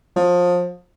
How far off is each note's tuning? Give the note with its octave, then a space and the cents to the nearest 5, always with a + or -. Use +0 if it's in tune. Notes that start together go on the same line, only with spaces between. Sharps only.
F3 +25